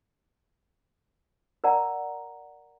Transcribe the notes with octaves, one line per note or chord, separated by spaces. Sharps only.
A#4 D5 F#5 A#5